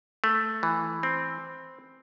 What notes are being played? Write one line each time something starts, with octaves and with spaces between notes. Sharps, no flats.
A3
E3
C4